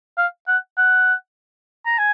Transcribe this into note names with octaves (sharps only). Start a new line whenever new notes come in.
F5
F#5
F#5
A#5
G#5